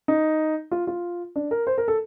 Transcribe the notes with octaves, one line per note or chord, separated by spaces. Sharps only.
D#4
F4
F4
D4
A#4
C5
A#4
A4